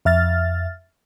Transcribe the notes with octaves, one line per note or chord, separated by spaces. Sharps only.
F2 E5 F6 A6